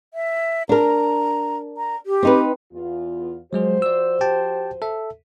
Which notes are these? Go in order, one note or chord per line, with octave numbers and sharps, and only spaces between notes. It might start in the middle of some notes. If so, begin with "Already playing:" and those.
E5
D4 A#4 A#5
A#5
G4
C4 D#4 B4
E2 F4
F3 F#3 G#3 F#4 G#4 C5
D5 E6
G4 G5 A5
A4 E5